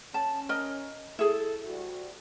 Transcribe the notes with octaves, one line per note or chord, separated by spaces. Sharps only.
C#4 A5
A#4 D#5
E4 G#4 A4
D2 G3 F#4